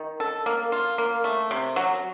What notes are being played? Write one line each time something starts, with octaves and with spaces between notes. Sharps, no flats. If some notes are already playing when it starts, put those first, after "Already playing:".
Already playing: D#3
A4
A#3
F4
A#3
A3
C3
F#3